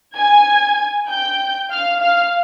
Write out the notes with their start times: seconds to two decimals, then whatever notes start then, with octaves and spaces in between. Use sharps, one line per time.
0.17 G#5 G#6
1.09 G5 G6
1.71 F5 F6
2.02 F5 F6